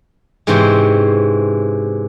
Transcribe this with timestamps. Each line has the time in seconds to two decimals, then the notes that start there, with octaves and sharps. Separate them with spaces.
0.47 G#2 C3 E3 C4 C#4 C5